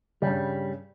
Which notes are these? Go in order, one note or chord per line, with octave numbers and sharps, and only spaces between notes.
G2 C#3 G3